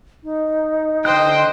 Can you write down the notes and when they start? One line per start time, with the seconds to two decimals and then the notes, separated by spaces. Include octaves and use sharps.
0.24 D#4
1.05 D3 C5 D#5 G5 F#6